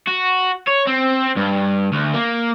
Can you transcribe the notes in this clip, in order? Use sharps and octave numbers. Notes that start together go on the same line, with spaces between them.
F#4
C#5
C4
G2
D2
A#3